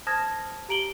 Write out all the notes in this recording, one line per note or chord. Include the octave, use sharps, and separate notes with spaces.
C5 A5 D#6 F6 G#6 A#6
G4 A#5 D7 F#7 G7